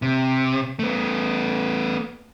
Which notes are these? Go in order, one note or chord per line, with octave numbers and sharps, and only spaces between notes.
C3
A3 B3